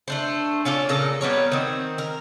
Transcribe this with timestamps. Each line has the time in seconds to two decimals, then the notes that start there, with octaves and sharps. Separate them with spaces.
0.08 A3 D4 C5
0.65 C#4 F4 A4 D5
0.89 A#2 C#3 A4 A#5
1.21 G3 B3 A#4 C#5
1.52 D#3 C4
1.98 A#4